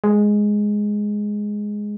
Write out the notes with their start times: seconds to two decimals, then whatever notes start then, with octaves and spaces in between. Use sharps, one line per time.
0.04 G#3